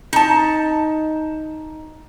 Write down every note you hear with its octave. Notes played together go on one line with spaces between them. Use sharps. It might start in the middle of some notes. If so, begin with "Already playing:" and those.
D#4 A5